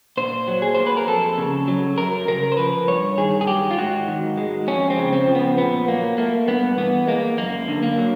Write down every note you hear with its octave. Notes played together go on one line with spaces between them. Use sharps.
A#2 C5
F#3
G#4
A#3 C5
B4
A#4
F2 A4
C#3
F#3
F#2 A#4
C#3 A#4
C5
F3 B4
G2 C#5
D#3 G#4
G#4
F#3 G4
F4
G#2 F#4
D#3
G#3
F2 C#4
C4
C#3
C4
F3
B3
A#2 B3
F#3 A#3
A3 A#3
G2 B3
E3 B3
G#3 A#3
F#2 A#3
D3
A#3
F#3